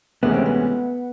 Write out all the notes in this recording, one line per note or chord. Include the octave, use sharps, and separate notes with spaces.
D2 C3 E3 G#3 B3 C#4
C4
B3